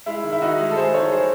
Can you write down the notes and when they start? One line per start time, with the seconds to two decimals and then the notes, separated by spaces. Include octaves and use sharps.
0.06 G#3 E4
0.24 D#3
0.32 E4
0.41 D#3 D#4 F#4
0.60 G#3
0.71 A4
0.76 G#3 G#4 C5
0.94 D#3 A4 C#5
1.12 D#3 G#4 C5